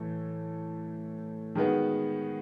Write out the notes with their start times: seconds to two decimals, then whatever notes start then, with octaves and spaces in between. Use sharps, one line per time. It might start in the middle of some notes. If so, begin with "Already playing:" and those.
Already playing: A2 E3 A3
1.55 D#3 G#3 B3 D#4 F#4